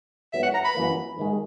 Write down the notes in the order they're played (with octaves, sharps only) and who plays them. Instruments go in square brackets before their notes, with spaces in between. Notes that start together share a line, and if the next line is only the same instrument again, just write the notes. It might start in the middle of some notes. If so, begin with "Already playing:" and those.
[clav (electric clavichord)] G#2 F#3 B3 [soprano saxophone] E5
[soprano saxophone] F#5
A#5
B5
[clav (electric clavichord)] F#2 E3 A#3
G#2 D#3 G#3